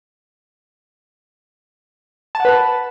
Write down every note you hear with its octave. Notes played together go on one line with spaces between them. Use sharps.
B4 F#5 A5